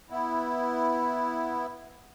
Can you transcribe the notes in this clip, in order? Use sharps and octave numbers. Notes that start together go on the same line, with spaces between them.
B3 E4